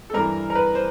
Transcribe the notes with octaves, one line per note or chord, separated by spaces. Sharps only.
A4
G2 E3 A#4
A#4
B4
C5